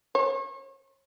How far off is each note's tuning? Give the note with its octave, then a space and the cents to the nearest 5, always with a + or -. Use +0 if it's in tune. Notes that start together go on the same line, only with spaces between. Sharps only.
C#5 -35